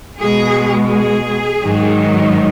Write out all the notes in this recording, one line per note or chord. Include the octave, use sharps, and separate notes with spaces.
B2 G#3 G#4
G#4
G#2 D#3 F#3